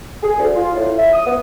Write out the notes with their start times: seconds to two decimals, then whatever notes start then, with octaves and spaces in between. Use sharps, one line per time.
0.23 G#4
0.39 D2
0.56 F4
0.75 A2
0.98 E5
1.13 D#6
1.27 B3